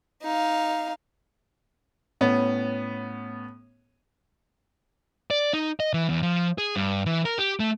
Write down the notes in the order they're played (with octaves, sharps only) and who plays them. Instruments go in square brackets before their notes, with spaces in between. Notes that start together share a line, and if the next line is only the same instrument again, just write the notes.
[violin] D#4 F5
[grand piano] A2 B3 C#4
[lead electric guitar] D5
D#4
D#5
E3
E2
F3
G#4
G2
E3
A#4
G4
A3